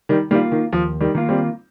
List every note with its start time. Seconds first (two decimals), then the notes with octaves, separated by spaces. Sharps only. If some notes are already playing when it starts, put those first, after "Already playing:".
0.09 D#3 G3
0.31 D#3 G3 A#3
0.35 F4
0.52 D#3
0.72 D#2 F3
1.01 D#3 G3
1.15 D#3 A#3 F4
1.29 G3 C4